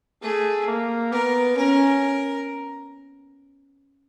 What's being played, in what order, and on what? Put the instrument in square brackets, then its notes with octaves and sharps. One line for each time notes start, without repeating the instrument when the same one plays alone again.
[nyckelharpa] A3 [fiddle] G#4
[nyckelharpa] A#3
[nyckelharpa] B3 [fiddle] A#4
[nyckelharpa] C#4 [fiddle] A#4